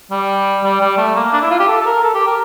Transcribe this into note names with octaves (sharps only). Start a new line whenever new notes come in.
G3
G3
G3
A3
A#3
D4
E4
F4
G4
A4
A4
A#4
A4
G4
A#4